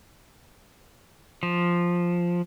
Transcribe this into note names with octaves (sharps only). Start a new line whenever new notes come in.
F3